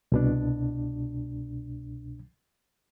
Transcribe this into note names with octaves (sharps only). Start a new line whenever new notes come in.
C2 B2 D4